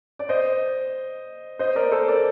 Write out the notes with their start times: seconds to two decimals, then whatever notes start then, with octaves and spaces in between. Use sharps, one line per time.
0.19 D5
0.29 C5 D#5
1.59 C5 D#5
1.75 A#4 D5
1.91 A4 C5
2.08 A#4 D5